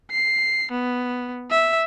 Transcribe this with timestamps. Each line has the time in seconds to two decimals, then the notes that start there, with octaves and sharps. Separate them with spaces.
0.12 C7
0.71 B3
1.51 E5